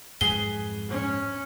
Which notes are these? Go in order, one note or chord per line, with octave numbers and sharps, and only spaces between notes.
F2 G#2 F#3 G#4 B4 G7
C#4